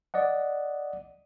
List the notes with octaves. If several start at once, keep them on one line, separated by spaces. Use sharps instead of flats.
D5 D#5 F#5